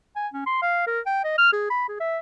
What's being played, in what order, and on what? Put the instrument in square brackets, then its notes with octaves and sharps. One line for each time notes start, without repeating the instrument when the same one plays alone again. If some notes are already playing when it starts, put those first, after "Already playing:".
[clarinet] G#5
C#4
C6
F5
A#4
G5
D#5
F6
G#4
B5
G#4
E5